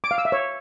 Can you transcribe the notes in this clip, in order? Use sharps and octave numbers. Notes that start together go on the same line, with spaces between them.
D6
F5
E6
E5
C#5